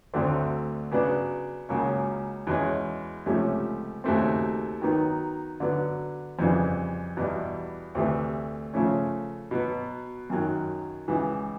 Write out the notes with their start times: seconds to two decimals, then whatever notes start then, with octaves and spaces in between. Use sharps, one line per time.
0.14 D2 D3 F#3 A3 C4
0.91 C#3 F#3 B3 D4
1.69 C#2 C#3 F#3 A#3 C#4
2.47 E2 B2 G#3 C#4
3.26 C#2 C3 F3 A3 C#4
4.04 D#2 C#3 F#3 A3 C4
4.82 D#3 F#3 B3 D#4
5.60 D3 F#3 B3
6.39 F2 C#3 E3 G3
7.17 E2 B2 G3
7.95 D2 C3 E3 A3
8.74 C#3 F3 A3 C#4
9.51 B2 F#3 B3
10.30 F#2 D#3 F#3
11.08 C#2 C#3 E3